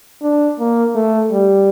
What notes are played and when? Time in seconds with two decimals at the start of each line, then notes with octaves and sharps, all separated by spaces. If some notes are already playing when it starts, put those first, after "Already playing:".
0.22 D4
0.59 A#3
0.95 A3
1.31 G3